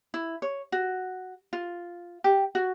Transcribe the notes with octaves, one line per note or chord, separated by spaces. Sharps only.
E4
C#5
F#4
F4
G4
F#4